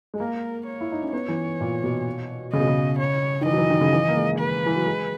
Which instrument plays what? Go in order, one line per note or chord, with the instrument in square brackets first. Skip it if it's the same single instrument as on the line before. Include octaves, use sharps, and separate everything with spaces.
[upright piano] G#3
[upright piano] A#3 [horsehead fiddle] A#4
[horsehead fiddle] C#5
[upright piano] E4
D#4
C#4
[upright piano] B3 [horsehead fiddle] C#5
[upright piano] E3
A#2
B2
[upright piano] C#3 [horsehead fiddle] D#5
[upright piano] B2
C#3
[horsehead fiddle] C#5
[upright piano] D#3
[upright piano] E3 [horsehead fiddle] D#5
[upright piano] F#3
E3
D#3
C#3
E3
A#3
G#3
[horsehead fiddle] B4
[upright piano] E3
F#3
G#3